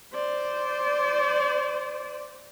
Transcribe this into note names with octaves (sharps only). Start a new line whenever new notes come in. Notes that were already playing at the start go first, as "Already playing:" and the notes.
C5 D5